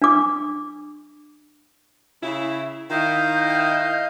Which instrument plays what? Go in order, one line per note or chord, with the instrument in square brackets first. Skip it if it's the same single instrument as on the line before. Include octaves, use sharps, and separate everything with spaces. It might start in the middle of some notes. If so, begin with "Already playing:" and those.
[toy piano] D4 D6
[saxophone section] C#3 E4
[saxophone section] D#3 E4 [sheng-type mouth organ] D#5 F5 [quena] G6